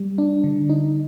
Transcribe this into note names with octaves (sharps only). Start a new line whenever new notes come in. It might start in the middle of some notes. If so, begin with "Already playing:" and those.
Already playing: G3
D4
D3
D#4